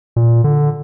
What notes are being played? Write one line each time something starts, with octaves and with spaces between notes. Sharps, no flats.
A#2
D3